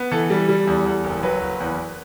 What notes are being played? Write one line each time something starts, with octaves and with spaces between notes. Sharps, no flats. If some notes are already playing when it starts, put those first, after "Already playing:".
Already playing: B3
E3 A4
G3
G3
E2
E2
F#1
F#3 B4
F#1
E2